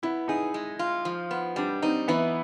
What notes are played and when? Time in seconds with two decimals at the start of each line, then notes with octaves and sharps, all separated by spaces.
0.03 B3 E4
0.28 D#4 G#4
0.54 G#3
0.79 F4
1.05 F3
1.31 B3
1.56 G3 D4
1.82 C4 D#4
2.08 E3 B3